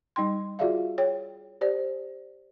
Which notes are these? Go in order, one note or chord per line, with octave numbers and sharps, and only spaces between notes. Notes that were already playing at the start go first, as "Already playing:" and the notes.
G3 D#4 G5 C6
F4 F#4 G#4 D5 E5 F5
G#4 C#5 G5
G4 C5 D5